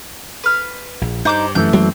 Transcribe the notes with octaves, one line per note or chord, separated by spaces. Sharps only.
B4 F6
A#1
G2 D#4 C5 D6 G6
F#2 E3 A3 G6
F#3 G#3 A#3 C4